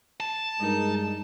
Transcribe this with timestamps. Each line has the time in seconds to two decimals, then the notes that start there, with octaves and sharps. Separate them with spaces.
0.20 A5
0.59 G2 G#3 D#4 A#4